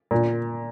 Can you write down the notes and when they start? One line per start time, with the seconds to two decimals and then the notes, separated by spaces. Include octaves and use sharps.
0.11 A#2